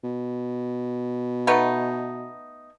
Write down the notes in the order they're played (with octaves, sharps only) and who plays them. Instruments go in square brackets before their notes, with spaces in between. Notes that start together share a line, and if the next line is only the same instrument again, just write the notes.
[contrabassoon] B2
[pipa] A3 B3 D#4